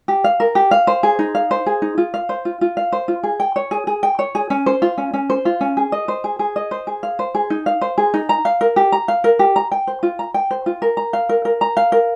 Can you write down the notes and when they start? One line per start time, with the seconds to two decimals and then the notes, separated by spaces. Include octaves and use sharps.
0.08 G4
0.24 F5
0.40 A#4
0.55 G4
0.71 F5
0.87 C5
1.03 G#4
1.19 D#4
1.35 F5
1.51 C5
1.66 G#4
1.82 D#4
1.98 F4
2.14 F5
2.29 C5
2.45 F4
2.61 F4
2.77 F5
2.92 C5
3.08 F4
3.24 G#4
3.40 G5
3.56 C#5
3.71 G#4
3.87 G#4
4.03 G5
4.19 C#5
4.35 G#4
4.50 C#4
4.66 C5
4.82 F4
4.98 C#4
5.14 C#4
5.30 C5
5.45 F4
5.61 C#4
5.77 G#4
5.92 D#5
6.08 C5
6.24 G#4
6.39 G#4
6.56 D#5
6.71 C5
6.87 G#4
7.03 F5
7.19 C5
7.35 G#4
7.50 D#4
7.66 F5
7.81 C5
7.98 G#4
8.14 D#4
8.29 A#5
8.45 F5
8.61 A#4
8.76 G4
8.92 A#5
9.08 F5
9.24 A#4
9.39 G4
9.56 A#5
9.72 G5
9.87 C5
10.03 F4
10.19 A#5
10.34 G5
10.51 C5
10.66 F4
10.82 A#4
10.97 A#5
11.13 F5
11.29 A#4
11.45 A#4
11.61 A#5
11.77 F5
11.92 A#4